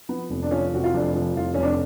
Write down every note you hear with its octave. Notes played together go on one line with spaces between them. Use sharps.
F3 B3
F1
D4
F3 C#4
F1 F#4
F4
F1 D4
F3
F1 F4
F1 C#4
D4